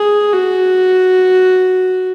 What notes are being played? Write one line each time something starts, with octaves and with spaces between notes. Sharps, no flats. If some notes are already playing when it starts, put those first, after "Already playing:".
Already playing: G#4
F#4